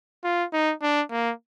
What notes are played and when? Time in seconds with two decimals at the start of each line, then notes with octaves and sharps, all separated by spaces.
0.24 F4
0.53 D#4
0.82 D4
1.11 A#3